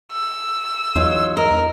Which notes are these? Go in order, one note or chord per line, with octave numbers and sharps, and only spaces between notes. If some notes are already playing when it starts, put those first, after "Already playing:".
E6
E2 F#3 D#4 F4
A#4 D#5